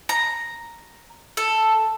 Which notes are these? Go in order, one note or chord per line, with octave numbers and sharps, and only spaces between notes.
A#5
A4